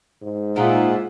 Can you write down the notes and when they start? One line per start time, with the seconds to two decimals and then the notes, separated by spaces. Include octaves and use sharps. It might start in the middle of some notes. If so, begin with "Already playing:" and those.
0.22 G#2
0.56 A#2 A#3 D#4 F4 G#4 E5 F#5